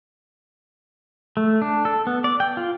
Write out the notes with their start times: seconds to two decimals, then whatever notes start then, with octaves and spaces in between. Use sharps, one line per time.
1.37 A3
1.62 D4
1.85 A4
2.07 B3
2.24 D5
2.40 G5
2.57 F4